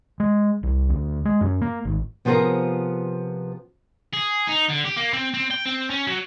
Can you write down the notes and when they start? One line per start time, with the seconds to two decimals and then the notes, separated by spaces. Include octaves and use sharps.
0.20 G#3
0.63 C2
0.89 D2
1.25 G#3
1.41 F#2
1.61 A#3
1.85 G#1
2.25 C3 F3 B3 F4 G#4 A#4
4.14 G#4
4.49 D#4
4.70 D3
4.85 G4
4.97 A#3
5.13 C4
5.34 C4
5.51 G5
5.65 C4
5.90 C#4
6.07 F#3